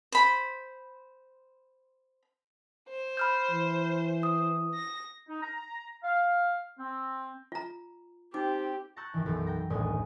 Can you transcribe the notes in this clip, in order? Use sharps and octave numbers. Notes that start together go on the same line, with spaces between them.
C5 B5
C5
B5 F6 G6
E3
D#6
A#6
D#4
A#5
F5
C4
F4 A#5
C4 D#4 G4 D6
A5 A#5 C#6 E6 F#6 G6
F#2 D#3 E3
B1 F#2 E3
G5 A#5
D#1 A#1 F#2 A2 D#5 G#5